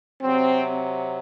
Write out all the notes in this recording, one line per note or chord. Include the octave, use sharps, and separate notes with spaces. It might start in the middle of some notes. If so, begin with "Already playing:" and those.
C3 F#3 C4